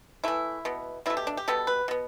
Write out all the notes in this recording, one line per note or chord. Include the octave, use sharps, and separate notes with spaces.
E3 A3 E4
B2 B3
B2 A3 E4
G4
D4
G4
B2 G3 B3 A4
B4
B2 B3